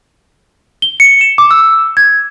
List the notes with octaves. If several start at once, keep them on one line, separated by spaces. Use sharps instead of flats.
G7
C#7
E7
D6
E6
G#6